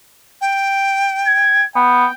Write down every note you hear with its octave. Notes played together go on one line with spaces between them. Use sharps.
G5
G#6
B3 G5